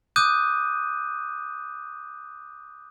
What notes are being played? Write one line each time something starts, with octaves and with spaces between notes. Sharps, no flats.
D6 D#6 F#6 G6 D#7